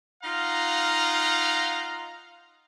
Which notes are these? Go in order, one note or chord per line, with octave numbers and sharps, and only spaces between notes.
D#4 F4 F5 F#5 A#5